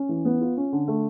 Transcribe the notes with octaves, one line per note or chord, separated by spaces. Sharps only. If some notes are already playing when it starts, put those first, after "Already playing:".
Already playing: C#4
E3
B3
F4
C#4
D3
A3